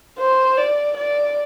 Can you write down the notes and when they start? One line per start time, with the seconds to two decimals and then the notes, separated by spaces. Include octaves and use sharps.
0.19 C5
0.58 D5
0.97 D5